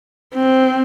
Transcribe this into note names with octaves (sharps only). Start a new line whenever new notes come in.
C4